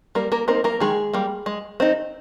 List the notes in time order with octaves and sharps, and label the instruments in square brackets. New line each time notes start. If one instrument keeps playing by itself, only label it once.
[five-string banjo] G3 A#3 A#4
A#3 A#4
A#3 C4 D#4 A#4
A#3 A#4
D#3 G#3 G#4
G3 A#3
G#3
C4 D#4